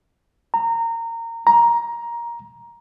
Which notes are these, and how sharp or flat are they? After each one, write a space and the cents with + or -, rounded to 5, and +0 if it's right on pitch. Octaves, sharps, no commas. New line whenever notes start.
A#5 -20
A#5 +15